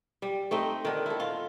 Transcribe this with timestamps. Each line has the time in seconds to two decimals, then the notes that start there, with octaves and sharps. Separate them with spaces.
0.22 G3
0.51 A3 C4 D#4
0.85 D3 D#3
1.06 E4 A4
1.20 F4